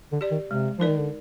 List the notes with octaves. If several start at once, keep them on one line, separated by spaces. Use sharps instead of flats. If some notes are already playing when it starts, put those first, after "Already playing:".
D3
G4 D5
D#3
C3 G#3
F3 D#4 A#4 D5
D#3
D3